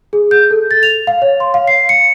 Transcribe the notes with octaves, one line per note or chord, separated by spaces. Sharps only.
G#4
G6
A4
A6
F7
F5
C#5
C6
F5
C7
C#7